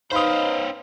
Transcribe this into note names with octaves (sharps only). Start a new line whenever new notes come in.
C#4 D#4 B4 C5 F5 B5 D#6